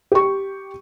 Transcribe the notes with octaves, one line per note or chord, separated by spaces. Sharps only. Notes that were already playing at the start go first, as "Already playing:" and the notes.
G4 C#6